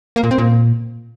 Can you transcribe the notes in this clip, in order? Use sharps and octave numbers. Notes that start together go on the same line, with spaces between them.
A#3
A#2
C4
A#2